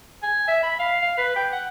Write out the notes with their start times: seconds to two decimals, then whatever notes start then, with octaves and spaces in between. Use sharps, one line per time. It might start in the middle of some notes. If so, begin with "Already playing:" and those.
0.23 G#5
0.48 E5
0.63 B5
0.79 F5
1.02 F5
1.18 B4
1.36 G5
1.52 F#5